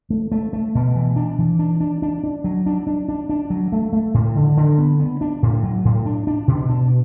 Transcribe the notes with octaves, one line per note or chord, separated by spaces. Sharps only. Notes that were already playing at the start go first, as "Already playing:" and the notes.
A3
A3
A3
B2
E3
D4
E3
D4
D4
D4
D4
F#3
D4
D4
D4
D4
F#3
A3
A3
A2
D3
D3
B3
B3
D4
A2
F#3
A2
D4
D4
B2
D4